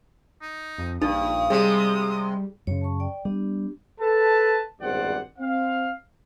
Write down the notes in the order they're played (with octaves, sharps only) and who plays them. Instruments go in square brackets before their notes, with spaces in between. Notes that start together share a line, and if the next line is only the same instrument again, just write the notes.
[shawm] D#4
[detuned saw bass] F2
[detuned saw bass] A#1 [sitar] G2 [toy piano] D#4 [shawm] D#6
[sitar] C3 G#3 [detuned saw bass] G3 [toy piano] G#4
[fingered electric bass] F#2 C#3 [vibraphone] C#5
[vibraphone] A5 C#6
D5 G5
[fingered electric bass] G3 [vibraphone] B3 D4 G4
[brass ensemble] A4 B4 A5
G#1 E2 G2 C5 D5 F#5
C4 F5